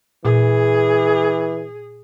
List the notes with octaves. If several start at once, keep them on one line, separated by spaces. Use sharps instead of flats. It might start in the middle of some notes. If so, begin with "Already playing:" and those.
A#2 E3 G#4